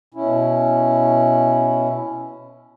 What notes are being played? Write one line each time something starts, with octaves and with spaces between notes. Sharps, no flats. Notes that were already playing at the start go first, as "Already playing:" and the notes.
B2 C#4 E4